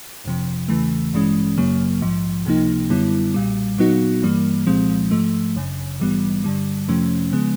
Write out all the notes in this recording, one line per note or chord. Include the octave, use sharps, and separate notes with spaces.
G1 F2 C3 F3
E2 C#3 E3 A3
A1 G2 E3 G#3 C#4
G#1 F#2 C#3 F#3 A#3
A#1 G#2 F3
C#2 C3 F3 A#3 D#4
F#2 D3 G3 B3 E4
B1 A#2 G3
A#2 F#3 B3 D#4 F#4
G2 E3 G3 A#3
C2 A#2 F3 G#3 C4
G#2 F3 A3
G1 F#2 C#3
A#1 G#2 E3 G3 B3
G2 D3 G3
F2 C3 F3 A3 C#4
C#3 F3 G#3 B3